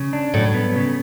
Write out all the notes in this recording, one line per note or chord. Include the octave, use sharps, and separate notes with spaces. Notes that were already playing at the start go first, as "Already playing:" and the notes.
Already playing: C#3
D4
A2 F#3
B3
C#3